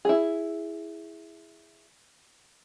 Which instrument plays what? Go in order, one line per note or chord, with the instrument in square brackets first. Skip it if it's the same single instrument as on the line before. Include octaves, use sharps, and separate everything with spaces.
[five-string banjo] E4 G#4